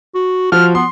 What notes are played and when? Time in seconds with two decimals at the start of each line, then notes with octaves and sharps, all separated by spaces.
0.14 F#4
0.52 F3 F#4 F6
0.75 B3 C6